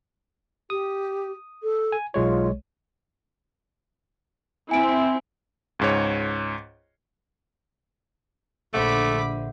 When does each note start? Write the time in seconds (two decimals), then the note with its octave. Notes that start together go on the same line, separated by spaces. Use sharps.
0.70 G4 D#6
1.63 A4
1.92 G#5
2.14 B1 G#3 F4 C#5
4.71 C4 E4 G#5 D7
5.79 C#2 G#2 C#5
8.74 A#1 D3 A3 C5 E5 F#5 B5 D6